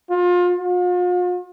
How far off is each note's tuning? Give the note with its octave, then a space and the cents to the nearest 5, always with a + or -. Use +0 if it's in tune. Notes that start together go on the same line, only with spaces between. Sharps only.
F4 +30
F4 +45